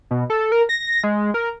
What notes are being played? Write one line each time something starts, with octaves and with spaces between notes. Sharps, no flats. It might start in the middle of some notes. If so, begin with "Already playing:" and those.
B2
A4
A#4
A#6
G#3
A#4